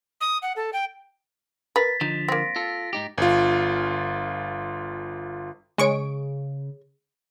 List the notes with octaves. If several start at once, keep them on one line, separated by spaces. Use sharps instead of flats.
D#6
F#5
A4
G5
A#4 B4 A6 B6
D3 F3 D#4
A#3 C4 A#6 D7
F4 A4
G#2 D#4 G4
G1 F4
C#3 G#3 G#4 C#5 C#6 D7